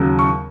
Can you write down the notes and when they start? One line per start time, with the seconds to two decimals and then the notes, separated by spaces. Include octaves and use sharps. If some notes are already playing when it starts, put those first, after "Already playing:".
Already playing: D#2 C#3 F#3
0.19 C#6